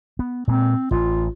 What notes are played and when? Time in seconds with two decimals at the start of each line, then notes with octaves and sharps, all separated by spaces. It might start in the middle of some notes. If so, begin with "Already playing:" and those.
0.19 B3
0.48 A#2 G#3 C4
0.91 A1 F4